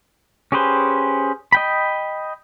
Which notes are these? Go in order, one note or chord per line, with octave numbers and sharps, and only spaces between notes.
C#4 G4 G#4 B4 C5
D#5 G5 B5